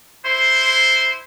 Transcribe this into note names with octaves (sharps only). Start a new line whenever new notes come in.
E4 C5